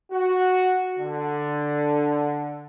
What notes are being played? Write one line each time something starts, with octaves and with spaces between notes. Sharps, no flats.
F#4
D3